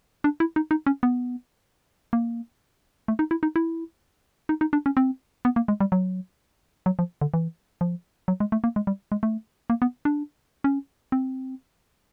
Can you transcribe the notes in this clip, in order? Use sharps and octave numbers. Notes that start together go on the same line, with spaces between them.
D4
E4
D#4
D#4
C#4
B3
A#3
A3
D#4
E4
D#4
E4
D#4
D#4
D4
C#4
C4
B3
A#3
G#3
G3
F#3
F#3
F3
D3
E3
F3
F#3
G#3
A3
A#3
G#3
G3
G#3
A3
A#3
B3
D4
C#4
C4